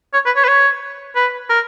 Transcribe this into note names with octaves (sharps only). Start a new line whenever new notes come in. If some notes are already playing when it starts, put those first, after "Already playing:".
C#5
B4
C#5
B4
C#5
B4
A#4